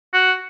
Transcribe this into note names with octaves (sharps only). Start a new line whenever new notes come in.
F#4